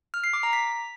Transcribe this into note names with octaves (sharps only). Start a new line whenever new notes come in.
F6
C7
D6
A#5
B6